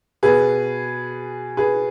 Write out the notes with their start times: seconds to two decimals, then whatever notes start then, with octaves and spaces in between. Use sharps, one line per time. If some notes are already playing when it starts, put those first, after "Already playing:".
0.23 B2 G#4 B4
1.57 G#4 B4